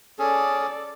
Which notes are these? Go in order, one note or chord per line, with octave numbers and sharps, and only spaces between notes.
C#4 G#4 A4 D5